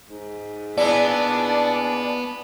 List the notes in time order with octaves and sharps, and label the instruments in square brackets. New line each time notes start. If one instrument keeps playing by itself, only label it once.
[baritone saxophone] G#2
[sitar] A#2 G#3 E4 [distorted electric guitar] B3 [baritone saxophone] D4 [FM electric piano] D5